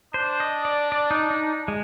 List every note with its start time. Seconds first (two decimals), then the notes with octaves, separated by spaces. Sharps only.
0.14 D4 C5
0.40 D#5
0.65 D5
0.92 D5
1.11 D#4
1.31 D#4
1.68 G#3